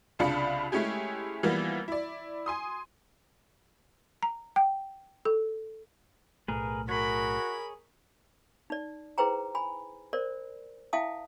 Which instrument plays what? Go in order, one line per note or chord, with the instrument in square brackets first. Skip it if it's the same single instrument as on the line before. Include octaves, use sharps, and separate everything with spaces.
[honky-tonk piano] C2 C#3 D4 F4 B5 C#7
G#3 A3 C#4 E4 G4 G#4
E3 F3 G3 A#3 B3
E4 D5
G#5 C6 D#6
[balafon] A#5
G5
A4
[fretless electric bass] B1 A2 A3 [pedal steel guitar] G#4 A#4 B4
[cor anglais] F#4 [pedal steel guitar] G#4 C#5 [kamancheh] A#4 B5
[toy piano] D#4 D5
E4 G#4 B4 C5 G5 A#5
G#5 B5
A#4 C5 D5
E4 E5 F5 G5 A5 D#6